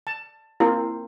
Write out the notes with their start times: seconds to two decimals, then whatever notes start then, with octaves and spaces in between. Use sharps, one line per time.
0.07 A5
0.60 A#3 C4 E4 F4